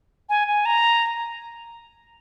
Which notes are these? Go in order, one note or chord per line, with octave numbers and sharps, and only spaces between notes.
G#5
G#5
A#5